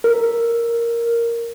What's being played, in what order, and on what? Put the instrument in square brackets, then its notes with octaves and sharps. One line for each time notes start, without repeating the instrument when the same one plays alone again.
[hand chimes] A#4